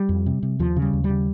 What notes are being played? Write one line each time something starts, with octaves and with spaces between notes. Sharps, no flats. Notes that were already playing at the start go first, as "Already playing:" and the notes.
Already playing: G3
F2
C3
C3
D#2 F3
C#3
G3
D#2
G3
C#3